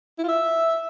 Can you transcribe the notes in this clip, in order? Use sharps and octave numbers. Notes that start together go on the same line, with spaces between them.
E4
F4
E5